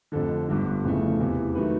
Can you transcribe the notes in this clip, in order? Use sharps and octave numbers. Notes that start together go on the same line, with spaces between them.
F1 F2 D3 A4
G1 G2 D3
F1 F2 C#3 E3 A3
E2 C3 E3
D#3 F#3 A3 B4